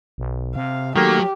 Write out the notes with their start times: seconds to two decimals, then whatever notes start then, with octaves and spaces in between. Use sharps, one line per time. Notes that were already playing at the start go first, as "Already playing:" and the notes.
0.18 B1
0.56 C3 F5
0.96 D#3 F#3 A3 A#3 G4